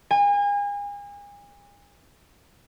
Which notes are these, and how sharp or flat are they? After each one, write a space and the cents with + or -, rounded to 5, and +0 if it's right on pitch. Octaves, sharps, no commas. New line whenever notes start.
G#5 -35